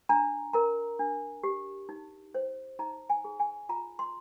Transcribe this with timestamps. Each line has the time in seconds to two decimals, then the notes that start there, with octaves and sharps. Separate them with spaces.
0.09 D4 A#5
0.53 A#4 A#5
0.99 D4
1.43 G4
1.89 D#4
2.34 C5
2.79 D#4 A#5
3.10 G#5
3.25 G#4
3.40 G#5
3.69 F4 A#5
3.99 C6